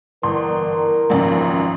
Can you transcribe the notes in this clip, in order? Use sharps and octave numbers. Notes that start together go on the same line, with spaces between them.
G1 E3 A#4 C6
G#1 C#2 F#2 F3